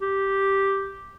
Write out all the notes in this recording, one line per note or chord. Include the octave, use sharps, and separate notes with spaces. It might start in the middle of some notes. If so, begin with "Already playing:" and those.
G4